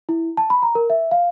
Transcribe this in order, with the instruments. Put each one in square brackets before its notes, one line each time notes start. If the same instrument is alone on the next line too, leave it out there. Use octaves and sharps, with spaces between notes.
[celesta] E4
A5
B5
A#5
A#4
E5
F5